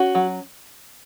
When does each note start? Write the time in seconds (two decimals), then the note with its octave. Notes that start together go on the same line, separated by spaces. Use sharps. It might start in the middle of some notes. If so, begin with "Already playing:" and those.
Already playing: C#4 F#4
0.15 F#3